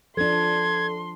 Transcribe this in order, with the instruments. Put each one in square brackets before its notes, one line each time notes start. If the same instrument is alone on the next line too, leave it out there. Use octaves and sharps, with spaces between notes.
[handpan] F3 D4 [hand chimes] A4 [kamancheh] C6 [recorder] G#6